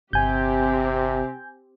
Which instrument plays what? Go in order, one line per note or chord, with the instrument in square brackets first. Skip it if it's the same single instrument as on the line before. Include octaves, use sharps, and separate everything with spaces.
[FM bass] G1 [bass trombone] C3 [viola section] C4 G4 [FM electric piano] G#5 G6